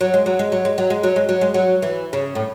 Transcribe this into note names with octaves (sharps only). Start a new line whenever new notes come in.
F#3
G#3
F#3
G#3
F#3
G#3
F#3
G#3
F#3
G#3
F#3
G#3
F#3
E3
C#3
A2